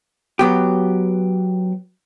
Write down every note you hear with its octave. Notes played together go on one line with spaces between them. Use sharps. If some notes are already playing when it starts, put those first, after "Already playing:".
F#3 B3 G4